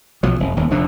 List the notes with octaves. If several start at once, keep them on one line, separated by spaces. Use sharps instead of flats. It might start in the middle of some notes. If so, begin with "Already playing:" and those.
B1 F3 F#3
F1
D#1 D#2
F1 F2 D3 D4